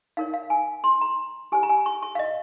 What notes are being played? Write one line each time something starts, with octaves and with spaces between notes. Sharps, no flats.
D#4 A#4 C#5 F5
F5
G#5
C6
A#5
G4 C5 G#5
A#5
G#5
C#6
C#6
F5
D#5